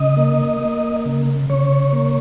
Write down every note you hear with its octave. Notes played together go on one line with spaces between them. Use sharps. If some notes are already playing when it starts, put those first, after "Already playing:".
Already playing: C#3 D#5
A#3
A#3
C#3
C#3 C#5
A#3